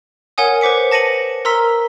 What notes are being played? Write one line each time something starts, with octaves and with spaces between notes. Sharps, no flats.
A#4 C#5 F#5 G#5 D#6
B4 C5 D6 B6 C#7
A5 A#6 C#7 D#7 F#7
A#4 A#5 C6 E6 B6